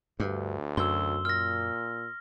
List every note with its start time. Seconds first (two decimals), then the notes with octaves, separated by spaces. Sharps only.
0.20 D2 G2
0.77 F#2 C6 E6 G7
1.25 A#2 F6 A#6